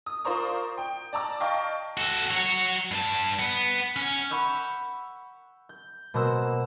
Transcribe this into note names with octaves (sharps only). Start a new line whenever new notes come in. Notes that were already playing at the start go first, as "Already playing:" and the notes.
D#6
F4 A#4 C5 D5 A#5 C#6
G5
D5 A5 A#5 D6
D#5 F5 G5 A5 C#6
F#4 A4
F#4 C#5
G2 A5
B3
C#4
F#5 B5 C#6 E6 G6
G6
B2 A#3 F#4 C5 F#5 E6